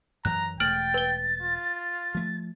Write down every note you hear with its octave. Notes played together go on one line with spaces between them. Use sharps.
F#2 E3 A#5 F#6
E1 A3 G5 F6 A6 D7 F#7
B4 G7
F4
F3 A3